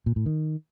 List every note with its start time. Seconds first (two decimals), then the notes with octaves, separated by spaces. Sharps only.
0.06 A#2
0.16 A2
0.26 D#3